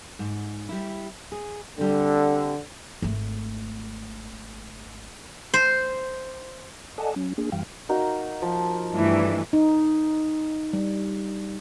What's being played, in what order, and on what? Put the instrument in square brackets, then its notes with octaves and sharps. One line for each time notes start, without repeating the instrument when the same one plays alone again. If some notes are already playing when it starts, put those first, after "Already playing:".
[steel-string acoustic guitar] G#2
G3 E4
G#4
[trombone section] D3 [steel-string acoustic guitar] G3 C4
[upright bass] G#1 A3
[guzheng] C5
[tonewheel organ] A4 D5 D#5 F#5 G#5 A5
F#3 C#4
A#3 D4 G#4
F#2 E3 G3 F5 G5
[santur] A#3 D#4 F#4
F3
[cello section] G2 E3 A3
[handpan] D#4
G3